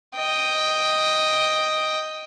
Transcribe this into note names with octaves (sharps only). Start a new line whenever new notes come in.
D#5 G5